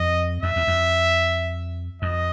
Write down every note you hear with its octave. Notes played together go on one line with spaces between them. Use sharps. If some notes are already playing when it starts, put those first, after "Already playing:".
Already playing: F2 D#5
F2 E5
E2
F2
F2 D#5